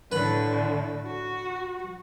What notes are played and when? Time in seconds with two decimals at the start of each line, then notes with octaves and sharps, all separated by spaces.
0.12 A2 D3 B4 B5
1.06 F#4